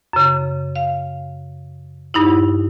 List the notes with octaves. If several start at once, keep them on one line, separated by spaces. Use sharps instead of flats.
F#2 C#3
F5
G2 D#4 E4